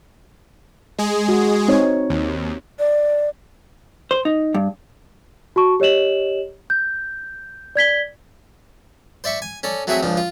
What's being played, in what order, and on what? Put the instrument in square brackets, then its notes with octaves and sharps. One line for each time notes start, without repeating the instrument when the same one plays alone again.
[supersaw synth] G#3 G#4
[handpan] F#4
C4 D#4 C#5
[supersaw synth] D#2
[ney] D5
[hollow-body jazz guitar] C5
D#4
G2
[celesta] F#4 A5 C#6
G4 C#5 D#5 E7 F#7
G6
D5 G#6 B6 G7
[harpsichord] C5 D5 E5 C#6
G#5
C#4 A4 D5
F#3 A3 C4 F#4 G#4 E5
C#2 F3 D4
F4